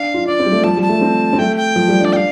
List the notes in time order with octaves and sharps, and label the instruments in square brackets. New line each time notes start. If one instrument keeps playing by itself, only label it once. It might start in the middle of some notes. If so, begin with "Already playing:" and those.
Already playing: [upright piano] D4 [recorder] F5
[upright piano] F4
[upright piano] D4 [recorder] D5
[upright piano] C4
G3
A3
[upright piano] F3 [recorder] A5
[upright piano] G3
[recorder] A5
[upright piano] A3
C4
C4
[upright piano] A3 [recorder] G5
[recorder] G5
[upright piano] F3
G3
D4
[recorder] D5
[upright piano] D4 [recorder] F5 G5